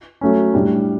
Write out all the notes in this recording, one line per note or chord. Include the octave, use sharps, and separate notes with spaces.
F#3 A3 C#4
A2 G3 D4